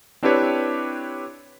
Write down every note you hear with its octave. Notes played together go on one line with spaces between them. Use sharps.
C4 D4 E4 G4 B4 C#5